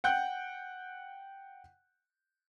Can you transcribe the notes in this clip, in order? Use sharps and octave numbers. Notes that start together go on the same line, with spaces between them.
F#5 G5 F#6 G6